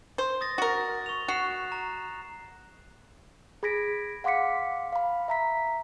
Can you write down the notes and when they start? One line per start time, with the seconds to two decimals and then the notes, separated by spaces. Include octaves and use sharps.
0.18 C5
0.41 D#6 A6 A#6
0.58 F#4 A#4 A6
1.06 C#6 F7
1.28 F#4 F#6 C7 E7
1.72 A#5
3.63 G#4 B5 G#6 A#6 B6 D7
4.24 F5 F#5 C6 D6 B6 C#7
4.93 F5 B5
5.28 E5 A#5 B6